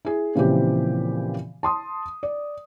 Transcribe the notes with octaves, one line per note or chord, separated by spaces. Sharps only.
E4 G#4
A#2 C#3 E3 F3 C4 G4
A5 C6 D#6
D5